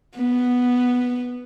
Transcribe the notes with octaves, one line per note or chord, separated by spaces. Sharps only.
B3